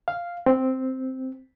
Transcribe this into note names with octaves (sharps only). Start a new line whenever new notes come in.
F5
C4